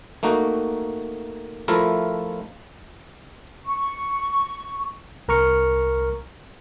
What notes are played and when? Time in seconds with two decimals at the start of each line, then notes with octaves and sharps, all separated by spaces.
0.23 A3 A#3 D#4 F#4
1.68 F3 A3 E4 F4 A#4
3.65 C#6
5.28 C2 A#4 A#5 C#6 F6 C#7